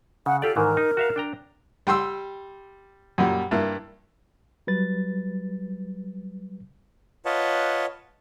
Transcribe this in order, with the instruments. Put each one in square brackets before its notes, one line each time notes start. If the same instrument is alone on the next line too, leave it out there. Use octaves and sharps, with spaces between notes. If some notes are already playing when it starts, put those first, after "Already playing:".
[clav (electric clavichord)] C#3 [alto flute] F#5
[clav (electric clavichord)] F4 G4 D5 [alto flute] A4
[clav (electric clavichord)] G#2 D#3 E3 [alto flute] A#4
[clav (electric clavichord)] D#4
F#4 E5 F5
D4 G5 A#5
[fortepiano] G3 G5 C6 E6
F#2 A#2 G3
G2 A#3 E4
[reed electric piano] F#3 G3 B4 A6
[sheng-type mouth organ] F4 B4 C#5 D#5 F#5 A5